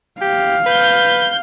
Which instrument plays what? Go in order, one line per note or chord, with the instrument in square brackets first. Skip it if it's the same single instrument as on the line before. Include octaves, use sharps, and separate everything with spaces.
[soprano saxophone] G4 [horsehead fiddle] F5
[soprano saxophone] B4 [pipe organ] G6